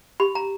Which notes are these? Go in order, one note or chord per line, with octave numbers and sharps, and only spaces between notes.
G4 B5
A#5